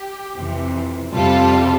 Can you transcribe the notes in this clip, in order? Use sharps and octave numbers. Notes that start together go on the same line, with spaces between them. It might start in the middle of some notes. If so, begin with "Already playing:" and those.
Already playing: G4
F2 C3 E3
F2 C3 G3 F4 A4